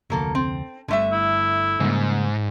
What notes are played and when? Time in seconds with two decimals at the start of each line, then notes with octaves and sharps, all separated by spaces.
0.10 F1 D2 F#3 A#3 A4
0.35 C4
0.88 G1 G2 D3 A3 E5
1.13 E4
1.80 G#2 C#3 G3 A#3